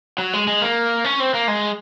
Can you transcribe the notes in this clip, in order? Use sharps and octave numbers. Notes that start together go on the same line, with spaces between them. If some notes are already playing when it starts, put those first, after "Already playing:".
F#3
G#3
G#3
A#3
C#4
C4
A#3
G#3